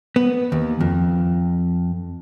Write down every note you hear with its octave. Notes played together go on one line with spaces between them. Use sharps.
B3
D#2
F2